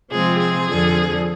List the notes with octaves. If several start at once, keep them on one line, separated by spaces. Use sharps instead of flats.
C3 F3 G#3 C4 F4 G#4
G#4
F2 D3 F3